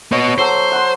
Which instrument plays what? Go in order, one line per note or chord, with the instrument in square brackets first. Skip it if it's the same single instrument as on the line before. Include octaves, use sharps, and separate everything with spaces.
[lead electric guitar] B3 D#5 [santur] C#5
[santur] F#3 A4 [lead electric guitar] C5
[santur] F#5 C6